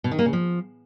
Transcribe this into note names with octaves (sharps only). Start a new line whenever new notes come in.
B2
D#3
A#3
C#3
F3